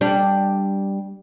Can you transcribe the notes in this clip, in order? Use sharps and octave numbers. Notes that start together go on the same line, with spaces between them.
G3 D4